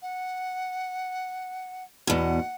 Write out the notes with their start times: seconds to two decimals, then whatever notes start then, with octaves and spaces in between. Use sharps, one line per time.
0.02 F#5
2.07 E2 B2 F#5